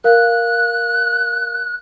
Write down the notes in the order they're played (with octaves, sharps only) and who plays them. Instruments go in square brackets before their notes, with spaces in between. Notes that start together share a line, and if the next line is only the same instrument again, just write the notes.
[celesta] A#4 F5 [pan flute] F#6